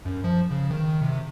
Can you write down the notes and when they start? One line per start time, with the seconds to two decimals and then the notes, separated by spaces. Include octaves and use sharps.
0.05 F#2
0.24 F3
0.51 C#3
0.71 D#3
1.02 C3